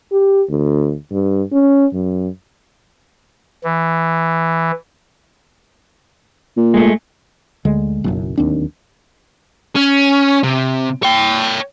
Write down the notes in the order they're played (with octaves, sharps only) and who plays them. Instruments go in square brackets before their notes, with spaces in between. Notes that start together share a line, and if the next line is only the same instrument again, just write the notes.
[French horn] G4
D2
G2
C#4
F#2
[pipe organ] E3
[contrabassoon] A#2
[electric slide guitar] G#3 A3
[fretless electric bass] D2 D3 G#3
F#1 B1 F#2
D1 D#2 C4 D4
[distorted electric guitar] C#4
C3
C#5 G5